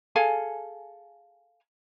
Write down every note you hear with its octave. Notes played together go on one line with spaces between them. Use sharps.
G#4 A4 F5 G#5